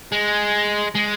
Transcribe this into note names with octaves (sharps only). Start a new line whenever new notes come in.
G#3
G#3